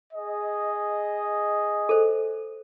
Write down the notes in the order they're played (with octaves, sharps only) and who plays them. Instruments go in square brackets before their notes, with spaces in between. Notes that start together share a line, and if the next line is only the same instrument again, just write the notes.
[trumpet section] G#4 D#5
[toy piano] A4 C5